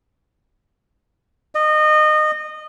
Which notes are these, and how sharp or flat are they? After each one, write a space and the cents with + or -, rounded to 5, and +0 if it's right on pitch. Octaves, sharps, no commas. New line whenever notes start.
D#5 -25